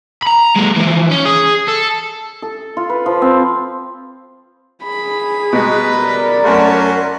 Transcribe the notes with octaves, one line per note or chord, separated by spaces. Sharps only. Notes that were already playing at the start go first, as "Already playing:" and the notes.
A#5 B5
G#3 A#3
E3 F3
C#4
G#4
A4
A4
F4
B4
F3
C4
G#4 B5
B2 G3 G#3 B4 A#5
A#4 D5
F#2 A3 C#4 F#4 C6